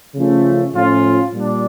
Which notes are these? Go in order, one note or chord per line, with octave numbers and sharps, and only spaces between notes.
C#3 F3 A3 C#4 F4
A2 F3 C#4 F4
A#2 G3 D4